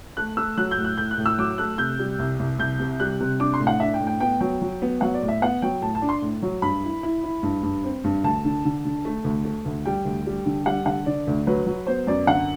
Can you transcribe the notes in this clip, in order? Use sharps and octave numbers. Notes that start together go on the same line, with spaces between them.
A3 F#6
A3 E6
F#3 F#6
G6
A2
F#6
A2 G6
F#6
A2
E6
F#3 D6
A3 F#6
C3 G6
G3
C2
C2
C2 G6
C3
G3 F#6
C3
D4 D6
C6
A2
F#5
D4 E5
G5
A2
G5
B3 G5
F#3 G5
F#3
B3
F#3 F#5
D5
A2
E5
B3 F#5
F#3 G5
A2 A5
A5
D4
C6
A2
F#3
G2 B5
E4
E4
E4
G2
G2
C4
G2
D2 A5
D3
D3
D3
A3
D2
A3
D2
G3 G5
D2
G3
D3
G3 F#5
D3 F#5
D3 D5
D2
F#3 B4
F#3
B3 C5
F#2 D5
D3 F#5